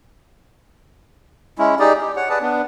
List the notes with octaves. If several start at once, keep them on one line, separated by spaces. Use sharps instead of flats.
G#3 C#4 E4
D#4 G4 G#4 D5
G4
C#5 F#5
G#4 B4 D5 A5
B3 D4